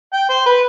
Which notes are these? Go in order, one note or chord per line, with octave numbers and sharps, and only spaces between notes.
G5
C5
B4